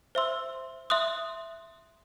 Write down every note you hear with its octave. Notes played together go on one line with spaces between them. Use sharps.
C5 E5 C6 E6
E5 C6 D#6 F#6